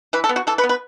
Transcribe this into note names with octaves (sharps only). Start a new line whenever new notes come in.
E3 B4
A4
B3
F#4
E3 A4
B4
B3
B4